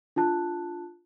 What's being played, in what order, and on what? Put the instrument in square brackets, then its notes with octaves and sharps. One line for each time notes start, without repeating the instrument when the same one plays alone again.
[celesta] D4 F4 A5 F#6